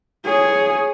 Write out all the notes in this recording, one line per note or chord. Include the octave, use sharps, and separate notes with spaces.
G#4 C#5